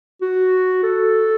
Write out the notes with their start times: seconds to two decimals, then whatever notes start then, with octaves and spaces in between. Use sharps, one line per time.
0.21 F#4
0.83 A4